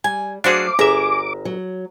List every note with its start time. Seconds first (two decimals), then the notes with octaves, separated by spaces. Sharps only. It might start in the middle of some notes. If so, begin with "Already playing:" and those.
0.04 G3 G#5
0.44 F#3 A3 D4 F#4 G#4 C5 F5 D6
0.79 G1 G#4 E5 A#5
1.45 F#3